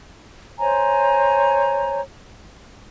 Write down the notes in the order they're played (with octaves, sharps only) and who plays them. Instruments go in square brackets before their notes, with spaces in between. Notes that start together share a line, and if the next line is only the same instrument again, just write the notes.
[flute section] C5 C#5 G#5 A#5